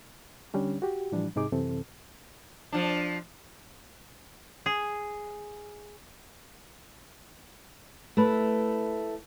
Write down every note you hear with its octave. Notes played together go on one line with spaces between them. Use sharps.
D3 G3 C#4 D4
F#4 G4
A2 E3 F3 G3 D4
G#2 C3 D#4 G#4 D6
F#2 C3 E3 C4 A4
F3 D4
G#4
A3 E4 B4